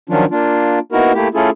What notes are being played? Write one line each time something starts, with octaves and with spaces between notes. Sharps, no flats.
D#3 F3 F#3 C#4 D4 F4
A#3 D4 F4
A#3 B3 D#4 E4 F#4 A#4
A3 A#3 E4 G4
A3 C#4 E4 F4 G#4 A4